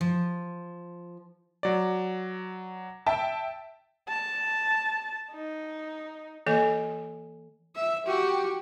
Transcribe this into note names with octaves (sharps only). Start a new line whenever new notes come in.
F3
F#3 D5
E5 G5 A5
A5
D#4
E3 A#3 A4 D#5 G#5
E5
F#4 G4